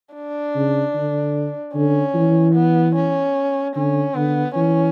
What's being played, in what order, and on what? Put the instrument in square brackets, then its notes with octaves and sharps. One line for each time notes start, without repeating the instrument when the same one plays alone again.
[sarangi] D4
[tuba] C#3
D3
[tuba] D3 [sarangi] C#4
[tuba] E3
[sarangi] B3
C#4
[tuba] D3 [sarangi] C#4
[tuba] D3 [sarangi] B3
[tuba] E3 [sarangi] C#4